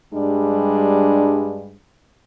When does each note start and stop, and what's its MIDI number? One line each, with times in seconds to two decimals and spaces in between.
0.14 1.76 43
0.14 1.76 55
0.14 1.76 56
0.14 1.76 62